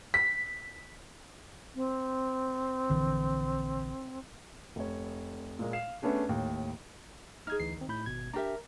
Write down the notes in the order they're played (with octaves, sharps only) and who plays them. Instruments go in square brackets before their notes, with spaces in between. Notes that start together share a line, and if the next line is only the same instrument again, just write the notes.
[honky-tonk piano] B6
[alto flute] C4
[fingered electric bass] A#1 D3 E3
[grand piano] F1 C#5
A#2 G#3 A#3
F5 C7 E7
A3 B3 C#4 D4 G#4
D#2 A2
[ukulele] D#4 G#4 [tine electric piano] F6 G#6
[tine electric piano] D2 E3 C7
D#3 C4
A2 B5 G6
G#1 B2 G#6
[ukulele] D4 G4 E5 [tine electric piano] A#4 A#5